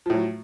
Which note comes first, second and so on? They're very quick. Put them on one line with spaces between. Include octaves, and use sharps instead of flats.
F3 A2 F#3